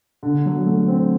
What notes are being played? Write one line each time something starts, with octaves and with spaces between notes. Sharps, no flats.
D3
F#3
A3
C4